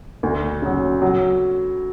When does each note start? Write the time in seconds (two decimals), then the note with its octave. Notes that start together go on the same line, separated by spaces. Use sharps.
0.23 D2
0.62 C#3 F#3
1.02 F#3